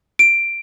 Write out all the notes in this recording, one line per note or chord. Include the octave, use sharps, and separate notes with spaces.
D7